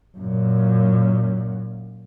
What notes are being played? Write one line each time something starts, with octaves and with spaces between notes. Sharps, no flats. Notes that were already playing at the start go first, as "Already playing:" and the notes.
F#2 A#2